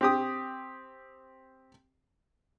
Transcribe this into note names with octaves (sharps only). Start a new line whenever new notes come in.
C4 G4 D#6